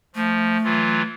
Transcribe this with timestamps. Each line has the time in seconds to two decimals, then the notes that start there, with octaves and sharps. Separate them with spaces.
0.15 F3 A3
0.64 E3 F#3 F4